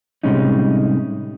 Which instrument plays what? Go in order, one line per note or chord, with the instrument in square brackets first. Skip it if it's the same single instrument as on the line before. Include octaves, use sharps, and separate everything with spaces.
[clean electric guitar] A2 C3 G3 G#3 C#4 D#4